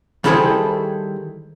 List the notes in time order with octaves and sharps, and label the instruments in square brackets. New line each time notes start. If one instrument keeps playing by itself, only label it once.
[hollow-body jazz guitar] D#3 G3 E4 G#4 A4 C5